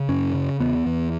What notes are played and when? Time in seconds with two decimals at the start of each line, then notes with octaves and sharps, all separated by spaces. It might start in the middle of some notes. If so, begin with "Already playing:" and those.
Already playing: C#3
0.09 F#2 C#4
0.34 C#3
0.60 E2 B3
0.86 E2